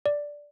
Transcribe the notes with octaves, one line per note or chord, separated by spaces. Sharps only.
D5